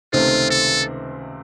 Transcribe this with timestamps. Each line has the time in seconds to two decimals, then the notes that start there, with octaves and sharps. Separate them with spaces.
0.13 C#2 C3 D#3 A3 C4 F4
0.50 A4